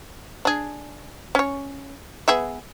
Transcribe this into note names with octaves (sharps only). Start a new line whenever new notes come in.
D4 G#4
C#4 C#5
B3 G#4 E5